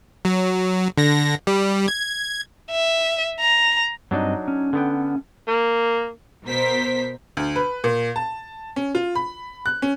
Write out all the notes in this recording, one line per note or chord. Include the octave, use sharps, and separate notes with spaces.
F#3
D3 A#6
G3
G#6
E5
A#5
G2 F#3 C4 D4 D#4 D#5
C#4
D3 B3 G5
A#3
B2 A#4 C5 B6
D2
B4
A#2
A5
C#4
F4
B5
F#6
C#4